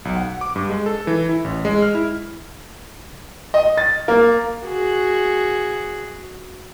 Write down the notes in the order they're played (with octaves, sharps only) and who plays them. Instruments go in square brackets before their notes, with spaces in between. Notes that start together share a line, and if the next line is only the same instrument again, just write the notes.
[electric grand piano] B1
F#5
D6
G2
G#3
A4
E3
E4
A1
G#3
F6
E4
[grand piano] D#5
A6
A#3
[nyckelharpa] F#4 G#4